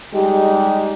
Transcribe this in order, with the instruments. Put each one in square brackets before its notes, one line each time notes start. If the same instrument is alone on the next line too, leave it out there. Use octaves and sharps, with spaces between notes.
[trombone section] G3 G#3 D#4 G4